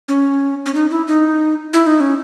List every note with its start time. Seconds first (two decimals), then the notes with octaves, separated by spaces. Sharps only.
0.08 C#4
0.66 C#4
0.74 D#4
0.91 E4
1.08 D#4
1.73 E4
1.87 D#4
2.00 C#4